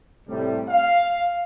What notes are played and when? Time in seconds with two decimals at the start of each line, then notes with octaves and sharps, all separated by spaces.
0.28 A2 C3 G3
0.69 F5